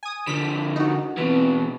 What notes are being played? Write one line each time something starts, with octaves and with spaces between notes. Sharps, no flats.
G#5 D#6
D3 F3 B6
D#4 F#4
B2 E3 C4 B4